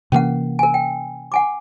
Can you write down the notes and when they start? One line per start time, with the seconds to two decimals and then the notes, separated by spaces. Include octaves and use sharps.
0.12 C3 E3 A#3 C#4 F#5
0.59 A#4 G#5
0.74 G5
1.32 F#5 G#5 D6